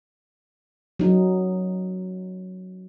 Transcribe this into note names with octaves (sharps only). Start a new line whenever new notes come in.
F#3 D#4